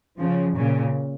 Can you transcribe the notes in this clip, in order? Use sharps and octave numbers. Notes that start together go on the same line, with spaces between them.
C#3 F3
A#2 C#3